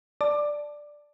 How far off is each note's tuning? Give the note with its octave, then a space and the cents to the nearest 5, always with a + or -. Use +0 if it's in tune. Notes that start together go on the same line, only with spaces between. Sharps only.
D5 +0 A5 +0 D6 +15